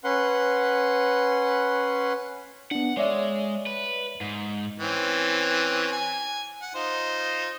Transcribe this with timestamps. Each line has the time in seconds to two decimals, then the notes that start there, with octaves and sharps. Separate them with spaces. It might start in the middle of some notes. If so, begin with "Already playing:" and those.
0.04 C#4 B4 F#5 C6
2.71 B3 D4 F#5
2.97 G#3 C#5 D5 E5
3.66 B4
4.21 G#2
4.80 E3 C4 C#4
5.92 G#5
6.62 F#5
6.75 D#4 F4 C5